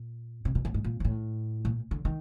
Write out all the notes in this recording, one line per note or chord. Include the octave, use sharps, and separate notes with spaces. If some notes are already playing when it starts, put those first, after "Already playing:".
Already playing: A#2
C3
B2
A2
G#2
A#2
G#2
A2
A#2
D3
D#3